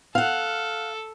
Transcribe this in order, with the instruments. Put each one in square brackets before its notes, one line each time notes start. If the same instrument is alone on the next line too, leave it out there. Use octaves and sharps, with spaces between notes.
[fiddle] A4 [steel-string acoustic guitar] F5 F#5